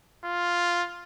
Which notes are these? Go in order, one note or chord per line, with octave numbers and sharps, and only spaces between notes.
F4